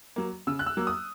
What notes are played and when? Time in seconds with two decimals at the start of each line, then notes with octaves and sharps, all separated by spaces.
0.16 F#3 A#3
0.47 C#3 E6
0.59 F#6
0.66 E6
0.77 F#3 A#3
0.87 D#6